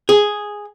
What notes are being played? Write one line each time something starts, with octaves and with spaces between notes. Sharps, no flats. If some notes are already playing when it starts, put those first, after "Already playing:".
G#4